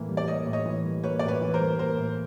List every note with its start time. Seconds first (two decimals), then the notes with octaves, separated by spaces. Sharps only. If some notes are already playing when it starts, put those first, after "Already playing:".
Already playing: A2 E3 A#3
0.09 G3
0.17 D5
0.28 A#3 C#5 D#5
0.46 A2
0.53 C#5 D#5
0.66 E3
0.85 G3
1.04 A#3 B4 C#5
1.19 A2 D5
1.28 B4 C#5
1.41 E3
1.54 A#4 C5
1.61 G3
1.79 A#3 A#4 C5
1.98 A2